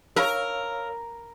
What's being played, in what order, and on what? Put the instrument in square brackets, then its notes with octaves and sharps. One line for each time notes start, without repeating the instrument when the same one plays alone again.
[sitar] A#4 [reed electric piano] C#5 F5 E6